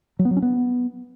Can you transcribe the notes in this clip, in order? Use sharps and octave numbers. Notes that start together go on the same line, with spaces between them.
F#3
B3
F#3
C#4
B3